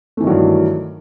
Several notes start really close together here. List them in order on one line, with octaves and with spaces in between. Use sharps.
A3 E3 D#3 F#3 G2